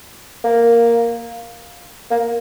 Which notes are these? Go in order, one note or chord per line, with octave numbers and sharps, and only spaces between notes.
A#3
A#3